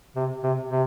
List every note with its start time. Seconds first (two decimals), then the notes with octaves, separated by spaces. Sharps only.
0.16 C3
0.44 C3
0.71 C3